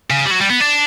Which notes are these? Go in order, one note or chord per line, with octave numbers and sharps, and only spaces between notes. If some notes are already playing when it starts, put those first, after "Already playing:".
C#3
G3
F#3
G3
B3
D4